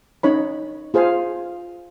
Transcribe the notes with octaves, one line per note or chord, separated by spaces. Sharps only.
C#4 D#4 C#5 B5
F4 G#4 C5 F5